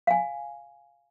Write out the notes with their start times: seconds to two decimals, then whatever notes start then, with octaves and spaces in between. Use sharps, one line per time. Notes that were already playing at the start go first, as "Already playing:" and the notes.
0.07 F5 G#5